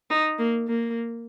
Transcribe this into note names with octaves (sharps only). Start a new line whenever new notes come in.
D#4
A#3
A#3